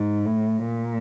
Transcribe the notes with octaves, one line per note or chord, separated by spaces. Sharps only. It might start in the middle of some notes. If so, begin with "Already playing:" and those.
Already playing: G#2
A2
A#2